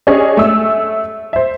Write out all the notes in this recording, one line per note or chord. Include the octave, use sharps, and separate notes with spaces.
C#4 D4 G4 G#4 C#5 D#5
A3 E6
C5 E5